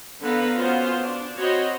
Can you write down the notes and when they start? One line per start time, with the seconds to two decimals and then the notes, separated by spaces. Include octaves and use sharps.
0.21 D3 B3 A4 B4 F5 A#5
0.56 B3 C#4 F4 F#4 C5
1.01 D4
1.36 C4 F#4 C5 C#5 D#5 B5